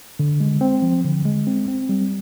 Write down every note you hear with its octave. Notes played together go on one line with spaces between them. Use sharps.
D3
G#3
C4
F3
D3
G#3
C4
C4
G3